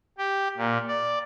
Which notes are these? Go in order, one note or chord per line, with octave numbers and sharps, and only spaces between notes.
G4
A#2
D5